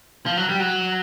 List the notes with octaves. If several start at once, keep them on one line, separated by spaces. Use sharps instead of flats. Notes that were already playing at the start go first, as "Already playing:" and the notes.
F3
F#3
G3
F#3